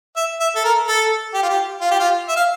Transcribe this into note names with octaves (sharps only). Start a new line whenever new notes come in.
E5
E5
A4
A#4
A4
G4
F4
G4
F4
G4
F4
E5
F5